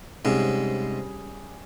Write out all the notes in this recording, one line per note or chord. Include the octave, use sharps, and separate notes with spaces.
G#2 C3 G3 C#4 G#4